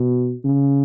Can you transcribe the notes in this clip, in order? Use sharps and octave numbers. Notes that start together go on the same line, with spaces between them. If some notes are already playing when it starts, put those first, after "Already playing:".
Already playing: B2
C#3